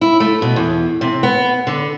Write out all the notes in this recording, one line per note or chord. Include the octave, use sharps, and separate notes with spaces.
E4
A3
B2
E2
C3
B3
D3